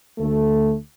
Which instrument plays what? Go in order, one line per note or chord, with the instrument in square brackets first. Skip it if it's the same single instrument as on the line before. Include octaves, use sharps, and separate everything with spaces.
[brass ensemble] D2 A3